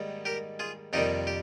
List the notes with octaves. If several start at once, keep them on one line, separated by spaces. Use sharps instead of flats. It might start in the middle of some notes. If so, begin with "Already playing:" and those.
Already playing: G#2 D#3 G3 A#3
G4 A#4
F4 G#4
F2 C3 D#3 G3 A#3 D#4 G4
G4